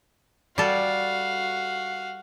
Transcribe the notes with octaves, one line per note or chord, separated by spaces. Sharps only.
G3 F#4 A4 F5